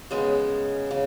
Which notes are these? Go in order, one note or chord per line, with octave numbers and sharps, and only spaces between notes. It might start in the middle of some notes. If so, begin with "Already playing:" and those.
C#3 G#3 B3
C#3